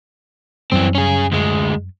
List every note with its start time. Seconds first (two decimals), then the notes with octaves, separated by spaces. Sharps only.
0.72 F#2 E3 F#3 G3 C4
0.95 C#4 G#4
1.32 D2 G#3